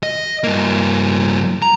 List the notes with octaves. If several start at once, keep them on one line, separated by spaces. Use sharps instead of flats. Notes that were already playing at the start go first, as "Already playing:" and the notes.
D#5
G2 A#3
A#5